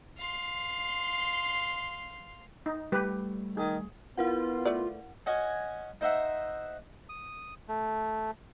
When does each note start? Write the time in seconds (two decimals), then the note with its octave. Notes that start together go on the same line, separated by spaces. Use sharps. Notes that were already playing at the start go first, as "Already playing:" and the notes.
0.18 F5 C6
2.66 D#4
2.92 G3 A3 G4 B4
3.57 D#3 G#4
4.17 B3 E4 F4 A#4 F#5
4.65 A3 B4 D5
5.26 C#4 F#4 D#5 G#5
6.01 D#4 C5 D#5 E5 F#5
7.09 D#6
7.68 A3